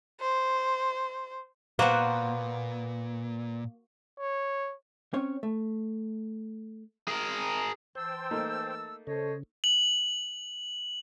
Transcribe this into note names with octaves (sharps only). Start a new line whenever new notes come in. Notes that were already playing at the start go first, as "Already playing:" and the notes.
C5
A#2 A#3 B3 F#4 B4 C5
C#5
C4 C#4 C#5
A3
G#4 A#4
E3 C5 G5 A5 E6
A3 A#3 D#4
C#3 A4 C5 C#5 D#5
F#7